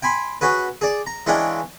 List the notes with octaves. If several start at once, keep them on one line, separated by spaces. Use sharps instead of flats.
G5 G#5 B5 C6
C#4 F#4 G#4 B4
G#4 D5
A#5
E3 G#3 C#4 D4 F5 G5